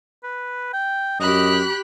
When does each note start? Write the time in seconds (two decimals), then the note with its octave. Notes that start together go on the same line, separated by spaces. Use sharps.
0.24 B4
0.73 G5
1.20 F#2 G4 D#5 B5 F#6